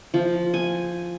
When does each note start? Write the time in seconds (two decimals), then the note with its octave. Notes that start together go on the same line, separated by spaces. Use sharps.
0.14 F3
0.54 G#5